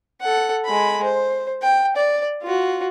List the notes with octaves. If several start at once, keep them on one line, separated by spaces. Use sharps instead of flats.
A4 F#5
G#3 B5
C5
G5
D5
F4 F#4